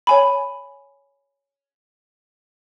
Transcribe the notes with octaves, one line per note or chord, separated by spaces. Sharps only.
C#5 G#5 B5